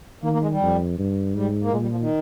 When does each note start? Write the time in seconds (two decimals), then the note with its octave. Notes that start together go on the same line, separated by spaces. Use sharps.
0.23 D#3 A#3
0.33 A#3
0.42 G#3
0.52 G3
0.61 F2
0.98 G2
1.35 G#2 G3
1.63 A#3
1.72 A#2 G#3
1.82 G3
1.91 F3
2.01 D#3